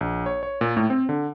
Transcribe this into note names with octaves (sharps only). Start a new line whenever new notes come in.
A#1
C#5
C#5
A#2
A2
C4
D3